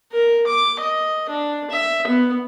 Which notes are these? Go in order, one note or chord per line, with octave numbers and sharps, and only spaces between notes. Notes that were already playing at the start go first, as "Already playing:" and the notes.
A#4
D6
D#5
D4
E5
B3